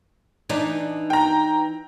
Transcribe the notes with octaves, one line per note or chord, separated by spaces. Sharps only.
E3 D4 D#4
G5 A#5